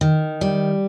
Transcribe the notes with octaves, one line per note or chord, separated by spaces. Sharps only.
D#3
G3